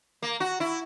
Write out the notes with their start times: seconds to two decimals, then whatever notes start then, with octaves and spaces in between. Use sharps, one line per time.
0.22 A#3
0.40 F#4
0.60 E4